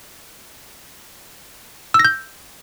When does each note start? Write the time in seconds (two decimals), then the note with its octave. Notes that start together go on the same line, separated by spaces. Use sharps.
1.94 E6
1.99 A#6
2.05 G6